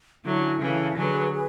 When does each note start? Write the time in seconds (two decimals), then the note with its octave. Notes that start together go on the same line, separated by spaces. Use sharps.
0.25 D3 F#3 C#4 E4 A4 E5
0.60 C#3 E3 C#4 E4 A4 E5
0.96 D3 F#3 G#4 B4 D5 G#5
1.32 G#4 B4